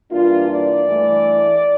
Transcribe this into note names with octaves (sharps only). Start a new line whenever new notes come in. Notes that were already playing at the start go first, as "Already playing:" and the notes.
G2 E3 A#3 D4 F4
D5
G2 E3 A3